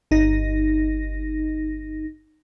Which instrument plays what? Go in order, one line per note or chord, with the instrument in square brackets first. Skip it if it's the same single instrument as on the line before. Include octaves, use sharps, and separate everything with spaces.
[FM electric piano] G1 D#4 A#6